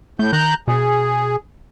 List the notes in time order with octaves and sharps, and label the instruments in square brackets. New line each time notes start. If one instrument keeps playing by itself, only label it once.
[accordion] A2 G6 [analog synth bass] A3
[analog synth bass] D#3 [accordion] A#5 F#6 G6
[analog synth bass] B2 [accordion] G#4